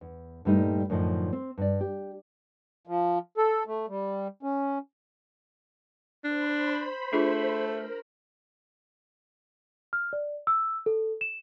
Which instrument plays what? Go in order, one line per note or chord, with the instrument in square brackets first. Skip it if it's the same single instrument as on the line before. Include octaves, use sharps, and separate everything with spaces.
[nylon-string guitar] E2
G2 A#2 G3 A3 D#4
F#2 A2 D3 F3 D#4 D#5
C4
G2 D5
G4
[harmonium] F3
A4
A3
G3
C#4
[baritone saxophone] D4 [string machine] C5 B5
[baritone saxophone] A3 [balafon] D4 F4 G#4
[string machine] A#4
[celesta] F6
D5
E6
A4
E7